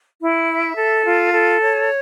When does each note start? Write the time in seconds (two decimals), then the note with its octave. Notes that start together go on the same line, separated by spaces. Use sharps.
0.21 E4
0.49 E5
0.77 A4
1.05 F4
1.33 A4
1.60 C#5